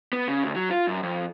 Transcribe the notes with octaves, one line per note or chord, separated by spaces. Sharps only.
B3
C#3
D2
F#3
F4
F#2
F2